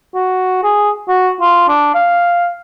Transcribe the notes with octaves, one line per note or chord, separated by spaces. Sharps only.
F#4
G#4
F#4
F4
D4
F5